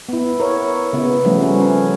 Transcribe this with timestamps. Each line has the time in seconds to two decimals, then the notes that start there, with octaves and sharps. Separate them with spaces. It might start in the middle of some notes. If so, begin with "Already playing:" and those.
0.09 B3 E4
0.40 A#4 C#5
0.93 C#3 B3
1.24 F3 G3 A3 C#4
1.42 C#4
1.60 C#4